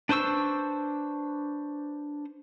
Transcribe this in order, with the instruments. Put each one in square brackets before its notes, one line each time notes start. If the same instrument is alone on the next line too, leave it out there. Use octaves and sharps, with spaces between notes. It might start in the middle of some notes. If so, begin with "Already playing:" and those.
[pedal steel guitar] D4 B4 C5 C#6 E6